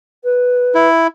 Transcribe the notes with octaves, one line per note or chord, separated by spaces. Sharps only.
B4
E4